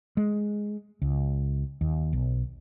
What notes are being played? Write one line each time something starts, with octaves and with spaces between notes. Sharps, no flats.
G#3
C#2
D#2
B1